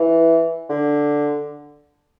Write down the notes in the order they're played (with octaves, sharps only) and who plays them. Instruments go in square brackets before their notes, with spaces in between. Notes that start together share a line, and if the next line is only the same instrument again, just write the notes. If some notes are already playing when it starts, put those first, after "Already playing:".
Already playing: [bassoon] E3
D3